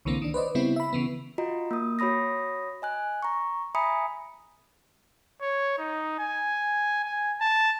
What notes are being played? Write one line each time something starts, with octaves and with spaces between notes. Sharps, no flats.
C2 D3 E3 A#3 C4
D#3 D4
B4 C5 D5 D#5
C#3 G3 B3 C4 E4
E5 B5
C#3 E3 B3
F4 F#4 D#5 A#5
A#3 D#6
F#4 C#5 B5 D#6 A#6
D#5 G#5 F#6
A#5 C#6
E5 G#5 A#5 B5 D#6 C#7
C#5
D#4
G#5
G#5
A5